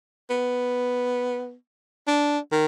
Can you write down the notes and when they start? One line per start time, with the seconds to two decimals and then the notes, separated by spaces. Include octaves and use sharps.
0.30 B3
2.08 D4
2.52 D#3